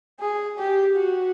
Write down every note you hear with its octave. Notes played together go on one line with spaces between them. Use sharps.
G#4
G4
F#4